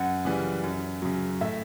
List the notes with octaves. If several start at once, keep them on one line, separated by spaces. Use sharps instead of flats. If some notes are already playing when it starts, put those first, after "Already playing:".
Already playing: F#2 F#5
C#3 E3 G3
F#2
C#3 F#3
A2 E5